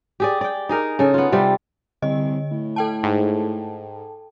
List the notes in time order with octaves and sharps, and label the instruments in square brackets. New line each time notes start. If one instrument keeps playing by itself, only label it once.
[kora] G4 G#4 D5
D5 G5
D#4 G#4 A#4
C#3 G#4 A4
B3 F4
C3 G3 F4 G4
[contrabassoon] C2 [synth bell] D3 D#5
[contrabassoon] A2
[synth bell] A4 G5 A5
[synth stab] G#2